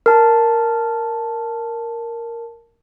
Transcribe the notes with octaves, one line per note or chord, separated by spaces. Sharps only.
A#4 A5